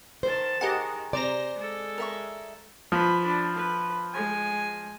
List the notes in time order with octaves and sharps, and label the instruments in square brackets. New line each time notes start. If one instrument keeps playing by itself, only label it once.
[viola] D#3 A5 [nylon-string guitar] C5
[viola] D#3 [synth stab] G4 D#5 F#5 [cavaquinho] G#4 A#4
[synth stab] C3 A#5 A#6 [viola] C5 [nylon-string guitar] D5
[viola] G#3 A4
[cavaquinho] A#4 E5 C#6
[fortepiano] F3 [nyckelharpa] B4 B5
[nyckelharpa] D4 B5
B4
G#3 G#5